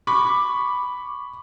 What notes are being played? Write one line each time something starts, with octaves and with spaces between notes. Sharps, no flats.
B5 C#6 D6